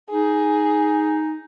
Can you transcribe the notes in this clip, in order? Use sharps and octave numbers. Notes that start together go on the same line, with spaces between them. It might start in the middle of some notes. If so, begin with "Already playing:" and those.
D#4 G#4